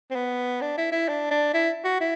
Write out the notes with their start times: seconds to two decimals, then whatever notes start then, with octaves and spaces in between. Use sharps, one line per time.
0.10 C4
0.15 B3
0.61 D4
0.77 E4
0.92 E4
1.08 D4
1.31 D4
1.53 E4
1.84 F#4
2.00 E4